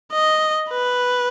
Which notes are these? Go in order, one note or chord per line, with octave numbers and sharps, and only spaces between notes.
D#5
B4